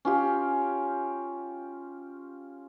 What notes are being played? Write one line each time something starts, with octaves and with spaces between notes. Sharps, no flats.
C#4 F4 G4